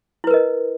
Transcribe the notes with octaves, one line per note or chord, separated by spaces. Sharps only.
E4 A#4 B4 D#5